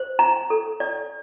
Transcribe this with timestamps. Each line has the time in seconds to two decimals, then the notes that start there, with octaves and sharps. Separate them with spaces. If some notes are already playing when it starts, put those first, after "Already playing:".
Already playing: C5
0.19 A#5
0.50 A4
0.80 D5